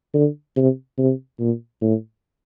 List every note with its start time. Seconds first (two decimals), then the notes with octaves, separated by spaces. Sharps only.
0.14 D3
0.56 C3
0.98 C3
1.39 A#2
1.81 A2